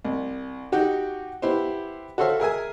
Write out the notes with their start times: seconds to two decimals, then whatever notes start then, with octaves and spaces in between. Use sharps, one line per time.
0.04 C2
0.72 D#4 F#4 G4
1.42 B3 E4 G4 C5
2.18 F#4 A4 C5 C#5 E5 F5
2.40 G#4 A#4 E5 G#5